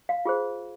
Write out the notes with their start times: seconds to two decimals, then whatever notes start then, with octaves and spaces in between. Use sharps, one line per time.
0.09 F5
0.25 F4 G#4 C5